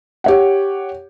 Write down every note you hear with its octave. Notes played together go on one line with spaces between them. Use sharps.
G4 C#5 F#5